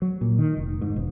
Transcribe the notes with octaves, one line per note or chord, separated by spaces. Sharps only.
F#3
A#2
D#3
F1
G#2
E1